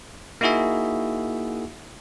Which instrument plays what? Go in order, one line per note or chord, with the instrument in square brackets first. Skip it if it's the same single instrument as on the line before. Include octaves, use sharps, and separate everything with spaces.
[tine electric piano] A#3 D#4 E4 F#4 G#4 E5